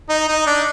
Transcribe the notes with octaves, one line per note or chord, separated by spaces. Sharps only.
D#4
D#4
D4